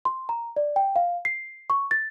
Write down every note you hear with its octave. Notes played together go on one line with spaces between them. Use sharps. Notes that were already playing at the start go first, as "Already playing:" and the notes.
C6
A#5
D5
G5
F5
C7
C#6
A6